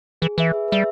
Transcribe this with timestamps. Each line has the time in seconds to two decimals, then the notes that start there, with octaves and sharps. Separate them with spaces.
0.22 E3 G#4
0.37 E3 B4 E5
0.53 G#4
0.68 G3 B4 E5